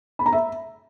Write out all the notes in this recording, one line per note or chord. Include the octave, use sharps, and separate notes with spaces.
B5
A#5
E5